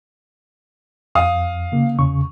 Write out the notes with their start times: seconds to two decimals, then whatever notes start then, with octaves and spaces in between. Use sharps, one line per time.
1.15 F2 F5 D#6
1.72 C#3 A#3
1.98 E2 C#3 C#6